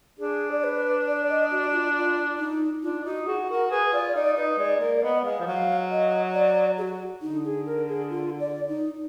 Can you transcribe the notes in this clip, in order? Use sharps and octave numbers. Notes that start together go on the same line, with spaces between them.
D4 G#4
D5
B4
D5
D#5
F#4
F4
F4
D#4
D4 F4
D#4 F#4
F#4 G#4
F#4 A#4
G#4 B4
F4 D5
D#4 D5
D#4 B4
G#3 D5
A#3 D5
B3 D#5
G#3 F5
F3
F#3 F5
D#5
D5
G#4
F#4
D3 D#4
G#4
A#4
G#4
F4
D5
D#4